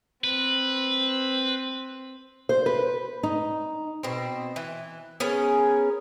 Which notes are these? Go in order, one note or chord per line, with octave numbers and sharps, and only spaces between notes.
C4 B4
C5
B4
D#4
B2 C4
E3
B3 C#4 G#4 A#4